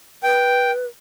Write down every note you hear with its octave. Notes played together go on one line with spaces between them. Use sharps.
B4 G5